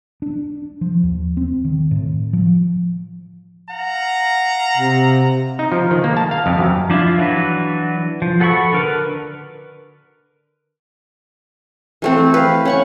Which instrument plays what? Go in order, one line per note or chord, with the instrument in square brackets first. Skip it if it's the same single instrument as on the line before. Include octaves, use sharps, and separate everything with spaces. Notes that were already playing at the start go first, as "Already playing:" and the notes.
[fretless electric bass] D4
F3
D#2
C4
D#3
A2
F3
[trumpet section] F5 F#5 A#5
[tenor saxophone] C3
[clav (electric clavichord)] D#4
F3
D#3
A#3
A5
F5
F2
F#2
[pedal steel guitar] F3 D4 E4 F4
E3 F#3 D4 F#4 B4
F3
F#4 A4 F#5 B5 C#6
D3 A#4 B4
[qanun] E3 A3 C4
B4 F5
C#4 F#5 C#6